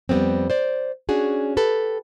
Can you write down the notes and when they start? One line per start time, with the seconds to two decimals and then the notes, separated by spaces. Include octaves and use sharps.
0.09 F2 G3 A3 B3 C4
0.50 C5 D5
1.09 C#4 D4 F#4 G#4
1.57 G4 A4 B4